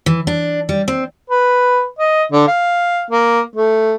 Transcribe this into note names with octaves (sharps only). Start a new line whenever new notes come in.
E3
D4
G3
C4
B4
D#5
D3
F5
A#3
A3